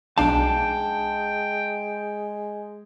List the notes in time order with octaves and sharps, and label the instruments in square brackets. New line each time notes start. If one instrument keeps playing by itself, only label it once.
[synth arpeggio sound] B1 D4 F5 [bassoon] G#3 [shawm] G5 [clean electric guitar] A5